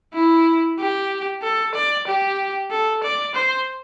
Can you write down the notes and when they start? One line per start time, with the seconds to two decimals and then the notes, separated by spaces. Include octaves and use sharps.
0.14 E4
0.79 G4
1.42 A4
1.75 D5
2.07 G4
2.71 A4
3.04 D5
3.35 C5